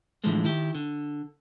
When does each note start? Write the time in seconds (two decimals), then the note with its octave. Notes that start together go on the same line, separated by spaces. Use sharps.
0.24 A2 D3 E3 F3 G#3 A3
0.44 D#3 E4 G4
0.75 D3